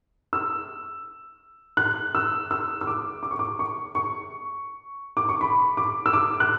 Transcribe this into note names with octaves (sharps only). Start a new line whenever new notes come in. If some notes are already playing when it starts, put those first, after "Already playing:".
E6
F#6
E6
E6
E6
D6
D6
C#6
D6
C#6
C#6
D6
C#6
B5
D6
E6
D6
F#6